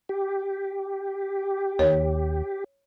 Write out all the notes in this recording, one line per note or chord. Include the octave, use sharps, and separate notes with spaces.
G4
D#2 C#5